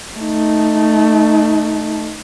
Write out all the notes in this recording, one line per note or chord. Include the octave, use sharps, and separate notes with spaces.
A3 D#4